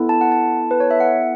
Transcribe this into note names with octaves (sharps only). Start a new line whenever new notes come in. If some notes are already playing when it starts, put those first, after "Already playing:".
Already playing: B3 E4 A4
A5
F#5
A5
B4
C#5
E5
F#5